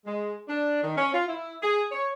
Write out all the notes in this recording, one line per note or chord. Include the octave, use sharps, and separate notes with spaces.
G#3
D4
D#3
C#4
F4
E4
G#4
C#5